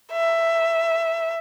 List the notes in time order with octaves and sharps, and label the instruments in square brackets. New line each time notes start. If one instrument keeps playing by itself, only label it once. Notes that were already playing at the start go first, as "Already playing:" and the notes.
[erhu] E5